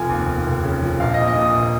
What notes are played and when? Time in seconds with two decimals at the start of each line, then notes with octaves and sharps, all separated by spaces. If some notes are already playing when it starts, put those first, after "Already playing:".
Already playing: F1 F3 G#5
0.09 D#2
0.28 D#2
0.46 F1
0.64 C#3
0.82 F3
1.00 A#1 F5
1.14 A#2 D#5
1.27 D#5
1.36 A#2
1.41 D#6
1.54 A#1